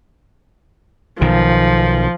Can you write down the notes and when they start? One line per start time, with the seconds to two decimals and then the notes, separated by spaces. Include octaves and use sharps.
1.21 B1 D#3 F3